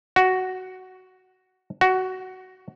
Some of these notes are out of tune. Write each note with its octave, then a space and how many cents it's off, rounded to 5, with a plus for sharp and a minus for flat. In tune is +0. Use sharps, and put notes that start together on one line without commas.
F#4 +10
F#4 +15